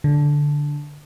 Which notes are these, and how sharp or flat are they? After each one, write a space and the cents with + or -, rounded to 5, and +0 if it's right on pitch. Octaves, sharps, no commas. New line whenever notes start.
D3 -5